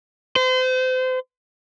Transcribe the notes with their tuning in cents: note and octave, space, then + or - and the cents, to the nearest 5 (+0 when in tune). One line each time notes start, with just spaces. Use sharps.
C5 -35